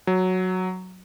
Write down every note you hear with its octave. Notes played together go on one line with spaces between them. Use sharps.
F#3